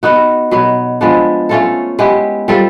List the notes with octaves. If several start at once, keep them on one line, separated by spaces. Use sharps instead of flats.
B3 D#4 F#4
B2 F#3 B3
F3 G#3 B3 D4
A3 C#4 F4 A4
G#3 B3 E4 G4
G3 C4 F4 A4